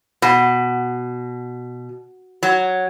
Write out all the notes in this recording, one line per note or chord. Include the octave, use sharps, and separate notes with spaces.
B2
F#3